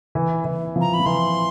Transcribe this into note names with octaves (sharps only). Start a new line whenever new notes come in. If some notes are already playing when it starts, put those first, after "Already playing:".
E3
E3
F3
A#5
B5
F3
E3 C6